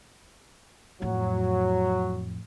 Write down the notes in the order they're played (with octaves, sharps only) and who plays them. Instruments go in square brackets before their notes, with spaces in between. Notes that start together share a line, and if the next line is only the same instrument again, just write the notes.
[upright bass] F2 A2 [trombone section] F#3